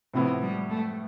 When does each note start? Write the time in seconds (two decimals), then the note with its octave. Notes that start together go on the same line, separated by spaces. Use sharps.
0.14 A2 C3 F3 B3 E4
0.42 G3
0.70 A3